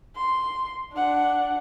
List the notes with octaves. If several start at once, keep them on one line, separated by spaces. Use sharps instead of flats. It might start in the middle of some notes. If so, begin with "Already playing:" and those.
C6
D4 F#5